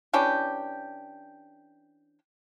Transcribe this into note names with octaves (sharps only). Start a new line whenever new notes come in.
E3 C#4 D4 G4